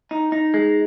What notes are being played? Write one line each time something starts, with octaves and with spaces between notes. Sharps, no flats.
D#4
D#4
G#3